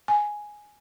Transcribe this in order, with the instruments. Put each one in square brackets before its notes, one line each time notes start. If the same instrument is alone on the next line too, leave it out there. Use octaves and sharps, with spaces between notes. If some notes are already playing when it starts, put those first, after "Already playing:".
[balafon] G#5